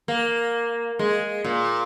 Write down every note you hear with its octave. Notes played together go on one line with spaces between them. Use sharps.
A#3
G#3
A#2